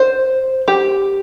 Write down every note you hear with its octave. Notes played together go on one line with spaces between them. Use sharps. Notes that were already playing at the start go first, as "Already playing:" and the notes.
Already playing: C5
G4